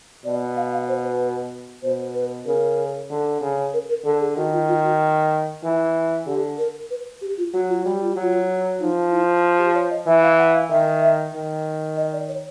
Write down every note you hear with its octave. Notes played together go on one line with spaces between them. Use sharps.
B2 D5
F5
F5
C5
B4
B2 C5
B4
C#3 A#4
D3
C#3
A#4
A#4
D3 A4
G#4
D#3 F#4
F4
F4
F#4
E3
D3 G4
A#4
B4
G4
F4
F#3 F#4
F4
G3 F#4
F4
F#3 F#4
F4
F3 D#4
E4
G4
C#5
D#5
E3 E5
F5
F#5
F5
D#3 E5
D#3
D#5
D5
C#5